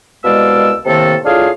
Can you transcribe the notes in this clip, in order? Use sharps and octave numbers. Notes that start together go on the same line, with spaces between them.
C2 B2 G#3 D5 F5 E6
A2 C3 D#3 A#3 C4 A4
A2 D4 F4 G#4 F5